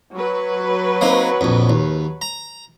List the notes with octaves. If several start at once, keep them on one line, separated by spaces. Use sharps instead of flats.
F#3 B4
A#3 C4 D#4
A#1 F2
D#2
A#5